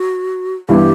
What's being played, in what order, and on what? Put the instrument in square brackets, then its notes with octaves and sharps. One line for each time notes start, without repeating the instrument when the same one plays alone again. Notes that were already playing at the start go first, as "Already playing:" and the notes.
Already playing: [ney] F#4
[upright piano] G2 E3 G3 B3 E4 [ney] G4